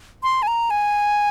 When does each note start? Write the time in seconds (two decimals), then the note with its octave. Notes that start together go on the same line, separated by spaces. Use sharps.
0.23 C6
0.42 G#5
0.47 A#5
0.70 G#5